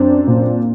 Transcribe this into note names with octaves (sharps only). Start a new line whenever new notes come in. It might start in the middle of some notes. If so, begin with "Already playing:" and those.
Already playing: F#2 C4 D4
A#2